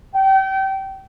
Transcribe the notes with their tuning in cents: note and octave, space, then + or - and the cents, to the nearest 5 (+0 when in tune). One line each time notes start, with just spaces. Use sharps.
G5 -30